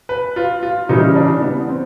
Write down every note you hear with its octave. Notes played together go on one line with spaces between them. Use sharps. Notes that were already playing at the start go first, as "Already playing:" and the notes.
B4
F4
F4
C#3 E3 G3 D#4
D4
B3
C4